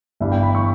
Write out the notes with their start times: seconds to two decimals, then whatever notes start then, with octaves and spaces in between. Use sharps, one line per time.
0.20 G1 G2 E3 G3 E5
0.32 G5
0.43 B5
0.55 C#6